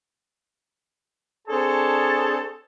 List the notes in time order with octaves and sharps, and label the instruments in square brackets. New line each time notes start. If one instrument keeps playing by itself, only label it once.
[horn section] C4 D4 G#4 A4 C#5 A5